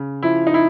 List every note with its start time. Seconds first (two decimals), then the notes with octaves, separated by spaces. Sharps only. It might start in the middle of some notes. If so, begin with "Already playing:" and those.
Already playing: C#3
0.23 F3 E4
0.47 D#4
0.54 E4